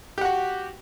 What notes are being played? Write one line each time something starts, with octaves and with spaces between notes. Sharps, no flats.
F#4 G4 F#5